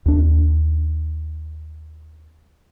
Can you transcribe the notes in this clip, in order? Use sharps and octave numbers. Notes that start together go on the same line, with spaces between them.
D#2 D4